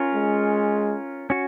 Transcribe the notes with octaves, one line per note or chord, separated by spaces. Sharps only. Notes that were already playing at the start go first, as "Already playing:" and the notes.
Already playing: C#4 F4 A#4
G#3
C#4 F#4